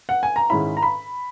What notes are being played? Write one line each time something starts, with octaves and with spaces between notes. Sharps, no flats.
F#5
G#5
A#5
G#2 D#3 G#3 C#4 E4 B5
A#5
B5